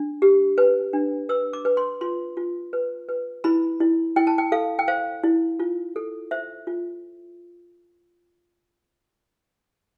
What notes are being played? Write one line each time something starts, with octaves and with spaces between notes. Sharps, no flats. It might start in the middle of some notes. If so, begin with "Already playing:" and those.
Already playing: D4
G4
B4
D4
B4 E6
D6
B4
C6
F4 C6
F4
B4
B4
E4 B5
E4
E4 G5
A5
G5
A4 F5
G5
C5 F5
E4
F4
A4
C5 E5
F4